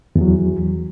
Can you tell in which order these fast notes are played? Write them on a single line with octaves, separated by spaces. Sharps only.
E2 E3 F#3